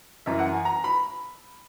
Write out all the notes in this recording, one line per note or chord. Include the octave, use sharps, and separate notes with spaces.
F#2 E3 E5
F#5
G#5
A#5
B5